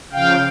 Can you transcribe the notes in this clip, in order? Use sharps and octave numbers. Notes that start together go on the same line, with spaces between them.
C#3 F3 F5 G5